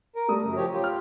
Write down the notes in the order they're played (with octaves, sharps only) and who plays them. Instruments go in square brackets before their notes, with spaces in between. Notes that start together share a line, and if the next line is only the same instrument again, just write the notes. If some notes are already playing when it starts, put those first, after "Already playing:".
[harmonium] A#4
[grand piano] G3 A3 D#6
[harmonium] F#2 [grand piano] C#3
[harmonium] F3 G4 C#5
F4 G4
[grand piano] F6